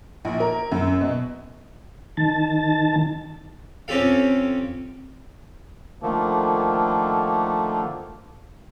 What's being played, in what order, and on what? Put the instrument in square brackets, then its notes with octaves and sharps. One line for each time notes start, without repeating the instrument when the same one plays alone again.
[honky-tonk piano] A#1
A#4
F#2
B2
[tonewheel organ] D#3 A5
[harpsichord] F2 C4 C#4 G4 A4 F5
[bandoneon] D3 D#3 F3 A3 A#3